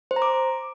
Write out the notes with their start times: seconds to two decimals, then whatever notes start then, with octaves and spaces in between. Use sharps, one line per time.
0.11 C5
0.16 A#5
0.22 D6